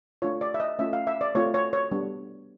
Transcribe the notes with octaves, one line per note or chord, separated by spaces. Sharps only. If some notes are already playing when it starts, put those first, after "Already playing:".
A3 D4 F4 C#5
D5
E5
D#5
A3 C#4 F4 E5
F5
E5
D5
A3 C4 F4 C#5
C#5
C#5
G3 B3 D4